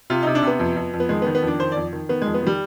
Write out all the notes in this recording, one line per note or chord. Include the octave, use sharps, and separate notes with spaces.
C3 F4
C3 D#4
D4
C3 B3
F2
F2
F2
B3
D#3 G#3
B3
D#3
B3
F2
D4
D#3 C5
F2 D5
D#3
D#3 B3
F2 G#3
B3
D#3 G3